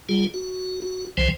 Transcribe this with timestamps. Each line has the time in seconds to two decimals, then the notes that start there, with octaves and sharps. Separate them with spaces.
0.09 G3 F4 G#4
0.34 F#4
0.82 F#4
1.17 C2 E3 F3 C5 G5 G#5